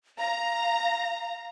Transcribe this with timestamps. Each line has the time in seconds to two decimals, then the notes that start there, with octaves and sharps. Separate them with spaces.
0.19 F5 A#5